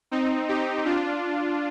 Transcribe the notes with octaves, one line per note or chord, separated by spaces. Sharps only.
C4 D#4
D#4 G4
D4 F4